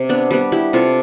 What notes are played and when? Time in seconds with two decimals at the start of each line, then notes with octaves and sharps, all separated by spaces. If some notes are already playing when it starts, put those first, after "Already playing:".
Already playing: C3
0.09 B3 D4
0.31 G3 B3
0.52 E4 G4
0.73 C3 F4 A4